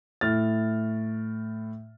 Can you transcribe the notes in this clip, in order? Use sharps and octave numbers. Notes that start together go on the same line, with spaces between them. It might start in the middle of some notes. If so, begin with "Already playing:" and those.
A2 F6 A6